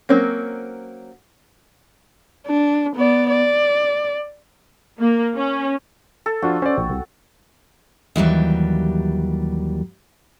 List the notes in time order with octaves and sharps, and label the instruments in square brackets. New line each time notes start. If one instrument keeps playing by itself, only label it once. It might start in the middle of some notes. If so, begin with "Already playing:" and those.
[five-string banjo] F#3 A#3 C4 C#4
[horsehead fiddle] D4
B3 D5
D5
[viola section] A#3
C#4
[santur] A4
[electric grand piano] F3 D4 F4 [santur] F#4
[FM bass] C#4 [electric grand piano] C5 D5
[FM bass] A#1 [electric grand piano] G5
[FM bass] C2
[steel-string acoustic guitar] D#2 E3 F#3 G3